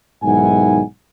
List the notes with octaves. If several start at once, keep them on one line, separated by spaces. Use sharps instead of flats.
B1 G#2 D#3 E4 F#5 G#5